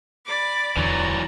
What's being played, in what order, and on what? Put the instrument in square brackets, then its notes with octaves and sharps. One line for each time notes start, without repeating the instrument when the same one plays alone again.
[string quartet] D5 B5 D6
[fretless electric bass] D1 E2 D3 [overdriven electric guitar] E3 F#3 [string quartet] D5 A#5